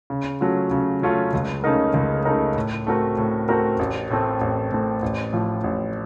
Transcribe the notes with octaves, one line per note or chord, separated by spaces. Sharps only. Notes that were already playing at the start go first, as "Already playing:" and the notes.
C#3
F#3 A3 C#4 F4
C#3
F#3 A3 C#4 F4
C#2
C#3 A3 D#4 A#4
C#2
C#3 A3 D#4 A#4
A2
A3 C4 F#4 A#4
A2
A3 C4 F#4 A#4
A1
A2 A3 C4
A1
A2 A3 C4
A1
A2 F3
A1